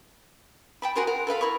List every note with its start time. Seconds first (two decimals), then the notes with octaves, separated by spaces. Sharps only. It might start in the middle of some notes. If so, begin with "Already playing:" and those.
0.82 G5 A5 B5
0.95 F#4 G#4 A#4 C5
1.07 A#4 F#5
1.27 A4 B4 F5 B5
1.41 E4 A#4 B5 C#6